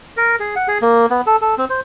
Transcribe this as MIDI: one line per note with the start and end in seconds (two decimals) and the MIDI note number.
0.17 0.36 70
0.40 0.55 68
0.56 0.68 78
0.68 0.78 68
0.82 1.06 58
1.10 1.21 59
1.27 1.36 69
1.42 1.55 69
1.58 1.65 60
1.70 1.80 72